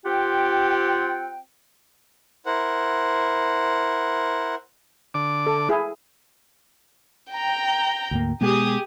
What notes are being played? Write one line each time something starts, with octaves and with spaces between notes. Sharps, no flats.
C4 F4 G4 F#5 G5
E4 A#4 C5 F#5
D3 D6
A4
E4 G#4
G5 A#5
D2 G#2 A#3
B2 G#3 B3 G4 G#4 D#6